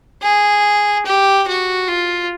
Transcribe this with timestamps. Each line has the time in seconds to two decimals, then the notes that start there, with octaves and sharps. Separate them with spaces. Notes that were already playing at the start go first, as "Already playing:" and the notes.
0.22 G#4
1.05 G4
1.47 F#4
1.88 F4